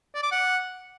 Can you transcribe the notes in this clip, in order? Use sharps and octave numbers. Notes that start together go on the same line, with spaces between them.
D5
D6
F#5